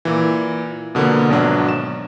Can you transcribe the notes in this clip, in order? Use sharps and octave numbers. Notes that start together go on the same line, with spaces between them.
A#2 E3
B2 D3 F3 A#3 B3
G#1 B2 F#3 D4
E7